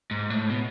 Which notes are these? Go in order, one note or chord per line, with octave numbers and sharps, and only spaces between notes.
G#2
A2
B2